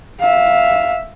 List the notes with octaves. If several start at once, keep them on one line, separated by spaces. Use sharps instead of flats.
E5 F5